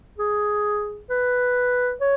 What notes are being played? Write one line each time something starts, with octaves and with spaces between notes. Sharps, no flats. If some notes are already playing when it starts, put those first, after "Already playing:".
G#4
B4
C#5